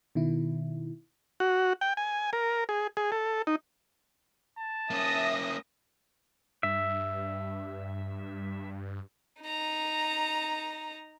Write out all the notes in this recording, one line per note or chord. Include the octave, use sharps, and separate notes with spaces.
B2 D#3 E4
F#4
G5
G#5
A#4
G#4
G#4
A4
D#4
A5
A#3 C#4 E5 D#6 A#6
G2 E5
D#4 A#5